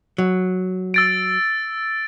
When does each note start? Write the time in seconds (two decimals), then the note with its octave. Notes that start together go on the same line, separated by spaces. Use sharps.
0.18 F#3
0.94 E6 A6 D7